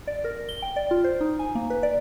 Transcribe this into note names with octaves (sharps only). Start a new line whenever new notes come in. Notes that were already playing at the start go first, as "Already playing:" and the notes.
D5
A#4
G7
G5
D5
F4
C5
D#4
G#5
A#3
B4
D5